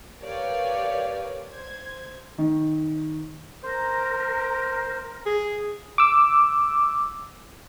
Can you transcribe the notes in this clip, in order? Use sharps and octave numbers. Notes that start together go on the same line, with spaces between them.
G4 A#4 B4 C#5 D5 F5
C5 G#6
D#3
A#4 C5
G#4
D6 E6